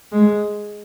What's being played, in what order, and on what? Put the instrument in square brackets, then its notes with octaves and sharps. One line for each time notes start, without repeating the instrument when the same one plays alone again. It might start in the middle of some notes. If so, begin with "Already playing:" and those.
[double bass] G#3